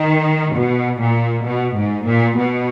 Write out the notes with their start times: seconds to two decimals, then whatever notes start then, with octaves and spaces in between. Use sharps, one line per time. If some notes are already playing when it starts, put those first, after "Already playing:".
Already playing: D#3
0.55 B2
1.00 A#2
1.45 B2
1.76 G#2
2.06 A#2
2.37 B2